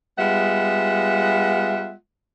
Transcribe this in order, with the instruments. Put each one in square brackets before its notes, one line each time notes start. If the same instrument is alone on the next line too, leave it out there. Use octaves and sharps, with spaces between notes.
[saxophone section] G3 G#3 B3 F4 E5 F#5